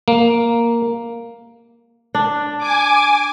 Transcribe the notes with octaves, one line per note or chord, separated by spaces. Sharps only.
A#3
D4
G#5 D6